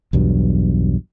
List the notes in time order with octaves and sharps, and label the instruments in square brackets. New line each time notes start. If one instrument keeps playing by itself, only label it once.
[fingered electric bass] B1 E2 G2 F#3